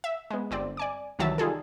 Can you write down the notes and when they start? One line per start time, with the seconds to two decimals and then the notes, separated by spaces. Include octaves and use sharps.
0.04 E5
0.30 G#3 B3
0.51 G1 C4 D5
0.77 D5 G#5 D6
1.19 C2 D#3 E3 F#3 E5 A5
1.38 G3 D#4 F4 G#4 A4